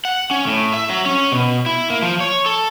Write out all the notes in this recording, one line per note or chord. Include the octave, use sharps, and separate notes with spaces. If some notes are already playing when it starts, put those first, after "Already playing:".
F#5
C#4
A2
E5
F#3
C#4
B2
E4
A#3
F3
C#5
A4